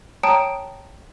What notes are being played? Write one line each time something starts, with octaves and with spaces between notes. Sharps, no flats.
C#5 G5 A5 A#5 D#6 D7